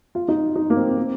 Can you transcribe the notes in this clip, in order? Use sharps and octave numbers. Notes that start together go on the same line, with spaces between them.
F4
D#4
D#4
A#3
C4
C4